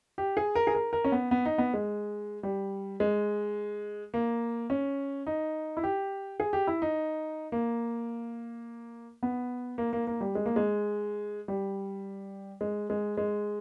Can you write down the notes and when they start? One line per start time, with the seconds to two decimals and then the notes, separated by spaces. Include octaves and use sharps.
0.18 G4
0.37 G#4
0.55 A#4
0.67 G#4
0.75 A#4
0.93 A#4
1.04 C#4
1.12 B3
1.31 B3
1.45 D#4
1.58 B3
1.74 G#3
2.43 G3
3.00 G#3
4.14 A#3
4.70 C#4
5.27 D#4
5.77 E4
5.83 G4
6.40 G#4
6.53 G4
6.67 E4
6.82 D#4
7.52 A#3
9.23 B3
9.78 A#3
9.93 A#3
10.07 A#3
10.21 G3
10.35 G#3
10.46 A#3
10.56 G#3
11.48 G3
12.61 G#3
12.90 G#3
13.17 G#3